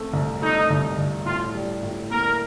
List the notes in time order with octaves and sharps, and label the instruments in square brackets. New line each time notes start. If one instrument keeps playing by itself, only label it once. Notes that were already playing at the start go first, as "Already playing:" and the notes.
Already playing: [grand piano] A3 C4
C2
[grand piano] A3 [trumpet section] D#4
[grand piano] C2
C2
[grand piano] A2 [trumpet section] F4
[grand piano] G3
A2
[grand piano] A#3 [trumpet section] A#4